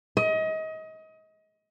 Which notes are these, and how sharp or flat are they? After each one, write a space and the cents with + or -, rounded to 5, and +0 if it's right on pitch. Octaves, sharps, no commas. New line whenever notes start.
D#5 +30